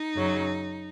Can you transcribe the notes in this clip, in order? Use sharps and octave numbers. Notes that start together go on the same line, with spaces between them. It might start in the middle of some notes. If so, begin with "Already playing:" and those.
Already playing: D#4
F#2 C#3 F#3